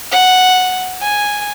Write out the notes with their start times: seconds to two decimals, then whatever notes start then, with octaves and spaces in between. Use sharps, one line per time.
0.11 F#5
1.01 G#5